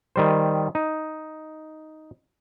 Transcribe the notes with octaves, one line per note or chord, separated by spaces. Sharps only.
D#3 G3 C5
D#4